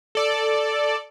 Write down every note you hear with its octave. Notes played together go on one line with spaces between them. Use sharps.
A4 D5